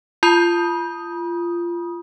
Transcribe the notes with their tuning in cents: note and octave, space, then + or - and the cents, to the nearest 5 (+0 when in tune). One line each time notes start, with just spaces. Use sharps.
F4 -20 B5 -40 D#6 +0